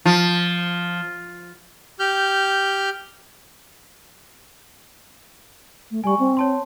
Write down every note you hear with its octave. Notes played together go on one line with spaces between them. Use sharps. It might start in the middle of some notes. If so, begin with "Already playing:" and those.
F3
G4 F6 G6
A3
G3 G#5 C#6
C4
C#5 A5 C6